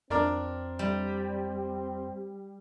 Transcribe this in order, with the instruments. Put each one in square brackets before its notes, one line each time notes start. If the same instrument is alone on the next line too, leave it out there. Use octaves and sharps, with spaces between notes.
[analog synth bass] F2 [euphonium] C4 [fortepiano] D4 A#4 D5
[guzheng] G3